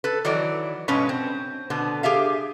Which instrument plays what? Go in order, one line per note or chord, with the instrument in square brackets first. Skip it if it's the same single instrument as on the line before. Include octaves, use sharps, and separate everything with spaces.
[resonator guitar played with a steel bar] A4 B4
D#3 E3 F#3 D5
G2 B2 F#3 G#3 C#4 B4
C4
B2 D3 B3
G4 G#4 E5 F5